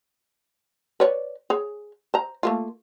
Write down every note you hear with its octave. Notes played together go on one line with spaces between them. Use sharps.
B4 C#5 D5
G#4 C#5
C5 A#5
A3 A#3 F4